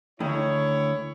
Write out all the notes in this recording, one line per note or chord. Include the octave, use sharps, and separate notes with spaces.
D2 D#3 E4 C#5